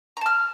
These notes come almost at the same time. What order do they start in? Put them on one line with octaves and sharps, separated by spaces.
A#5 A5 F6